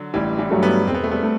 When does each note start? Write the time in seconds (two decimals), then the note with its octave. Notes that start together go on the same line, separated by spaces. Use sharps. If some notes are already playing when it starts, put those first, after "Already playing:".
Already playing: D3 F#3
0.14 A1 E3 G3
0.38 E3 G3
0.50 G2 F#3 A3
0.63 G3 B3
0.87 E1 C4
0.94 B3
1.04 A3
1.11 G3 B3
1.23 A3